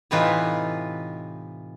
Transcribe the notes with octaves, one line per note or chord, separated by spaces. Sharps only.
A2 C3 E3 D#4 F4 B4